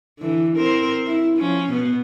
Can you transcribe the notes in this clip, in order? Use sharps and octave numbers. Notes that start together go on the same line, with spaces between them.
D3 E3
C4 A#4 C5
E4
F3 C#4
B2 B3